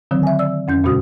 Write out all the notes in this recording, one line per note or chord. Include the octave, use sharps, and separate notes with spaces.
D3 D#3 F#3 C4
E5 G#5
D5 E6
F2 C#4 G6
E2 A#2 C#3 G#3 F#4 D#6